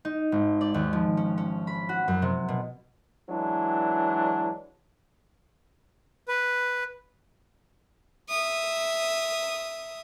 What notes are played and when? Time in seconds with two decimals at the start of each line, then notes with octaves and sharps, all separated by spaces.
0.05 D#4
0.32 G#1
0.61 D5
0.74 D#2
0.93 F3
1.17 C#4
1.38 C#4
1.67 B5
1.89 F#4
2.08 F#2
2.22 C3
2.48 B2
3.29 E3 F#3 G#3 D4
6.28 B4
8.29 E5 D#6